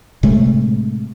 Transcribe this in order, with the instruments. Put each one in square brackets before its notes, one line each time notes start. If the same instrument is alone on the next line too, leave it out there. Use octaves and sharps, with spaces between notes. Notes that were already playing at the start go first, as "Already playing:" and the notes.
[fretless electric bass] A2 C3 G#3 A3